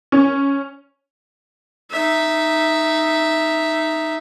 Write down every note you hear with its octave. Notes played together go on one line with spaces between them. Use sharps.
C#4
D#4 E5